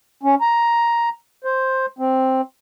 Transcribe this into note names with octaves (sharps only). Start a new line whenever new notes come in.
C#4
A#5
C5
C4